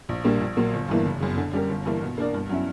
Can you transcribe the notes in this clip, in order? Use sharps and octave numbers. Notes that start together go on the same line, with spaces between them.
A#1
A#2 G3 A#3 D4
A#1
A#2 F#3 A#3
G1
G2 E3 A#3
F#1
F#2 C#3
D3
G3 C#4 G4 A#4
G1
G2 E3 A#3
B2
A#3 D4 A#4 D5
G2
F#3 C#4 E4